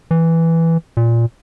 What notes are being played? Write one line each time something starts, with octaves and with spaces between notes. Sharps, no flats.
E3
A#2